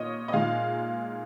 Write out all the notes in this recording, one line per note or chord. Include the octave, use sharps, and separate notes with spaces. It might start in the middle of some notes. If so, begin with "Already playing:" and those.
Already playing: A#2 A#3 D#4 C#5 D#5
D#5
A#2 G#3 D#4 F5